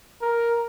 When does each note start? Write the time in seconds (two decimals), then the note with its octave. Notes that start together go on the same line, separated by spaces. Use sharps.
0.22 A#4